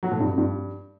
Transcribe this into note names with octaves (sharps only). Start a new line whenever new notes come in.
F#3
A2
G2
F2
G2